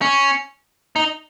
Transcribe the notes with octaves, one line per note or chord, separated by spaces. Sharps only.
C#4
D#4